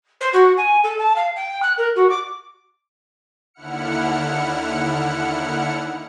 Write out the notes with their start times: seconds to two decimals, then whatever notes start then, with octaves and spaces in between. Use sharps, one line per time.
0.21 C5
0.33 F#4
0.57 G#5
0.83 A4
0.99 A5
1.16 F5
1.36 G5
1.63 F#6
1.77 A#4
1.96 F#4
2.10 D6
3.54 D#2 D3 E4 F#5 F6 C#7